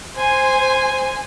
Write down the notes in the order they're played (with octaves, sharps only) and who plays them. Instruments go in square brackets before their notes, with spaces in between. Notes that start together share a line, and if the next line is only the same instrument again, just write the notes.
[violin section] C5 G#5